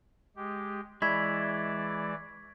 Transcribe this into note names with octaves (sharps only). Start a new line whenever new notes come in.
G#3 G4
E3 G#3 E4 D5 C#6 G#6 B6